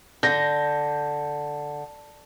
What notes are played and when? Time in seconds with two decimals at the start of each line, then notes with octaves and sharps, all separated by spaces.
0.23 D3 G6 A#6